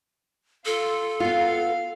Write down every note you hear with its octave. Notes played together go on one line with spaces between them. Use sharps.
F4 A4
B3 F4 F5